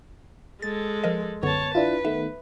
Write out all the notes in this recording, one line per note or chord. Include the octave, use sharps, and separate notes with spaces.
G#3 A4 A6
F3 A#4 D#5
B1 F#2 D3 B3 C#5 A5
D4 E4 F4 B4
D#3 A3 B3 E5